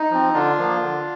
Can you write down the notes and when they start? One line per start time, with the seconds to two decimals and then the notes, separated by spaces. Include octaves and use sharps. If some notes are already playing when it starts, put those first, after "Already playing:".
Already playing: D#4
0.11 F3 C4
0.34 D3 D4 F4
0.58 F3 A#3
0.81 D3